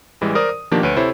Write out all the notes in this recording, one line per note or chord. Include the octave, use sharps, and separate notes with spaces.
A1 E3 G3 G#3
A#4 C5 D5 D#6
D#6
B2 D#3 F3 A#3 D4 G4
D2 B4 C#5 D7 D#7
C3 E4 A4 C5 C#5